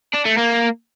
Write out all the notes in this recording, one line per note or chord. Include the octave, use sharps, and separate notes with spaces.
D4
A3
A#3